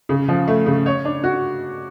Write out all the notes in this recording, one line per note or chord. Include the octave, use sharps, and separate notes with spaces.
C#3
F3
A3
C#3
C#5
D4
F#4